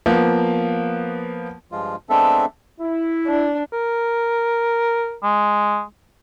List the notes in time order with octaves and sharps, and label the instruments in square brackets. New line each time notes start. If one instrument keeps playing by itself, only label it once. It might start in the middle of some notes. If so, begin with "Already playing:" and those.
[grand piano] F3 A#3 B3
[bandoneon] G2 F3 G#3 F4
G#3 B3 C4 D4 A4 E5
[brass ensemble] E4
[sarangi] D4
[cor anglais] A#4
G#3